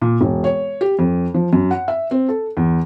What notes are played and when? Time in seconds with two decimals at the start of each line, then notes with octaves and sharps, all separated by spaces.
0.01 A#2
0.21 E1
0.44 C#5
0.81 G4
0.99 F2
1.34 F3
1.53 F#2
1.71 F#5
1.88 E5
2.11 C4
2.29 A4
2.57 E2